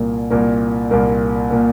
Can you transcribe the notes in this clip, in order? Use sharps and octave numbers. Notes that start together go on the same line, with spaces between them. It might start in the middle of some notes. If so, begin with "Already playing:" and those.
Already playing: C2 A#2 A#3
C2 A#2 A#3
C2 A#2 A#3
A#2 A#3